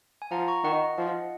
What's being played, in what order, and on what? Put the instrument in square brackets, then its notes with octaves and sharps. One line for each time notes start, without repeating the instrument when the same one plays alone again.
[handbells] G#5
[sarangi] F3 [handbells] F#5 A#5
[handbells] A#5 C#6
[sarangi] D#3 [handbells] D#5 F#5
[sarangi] F3